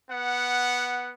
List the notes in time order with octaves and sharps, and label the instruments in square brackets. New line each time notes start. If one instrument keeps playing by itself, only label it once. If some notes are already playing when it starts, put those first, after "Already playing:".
[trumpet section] B3 F#5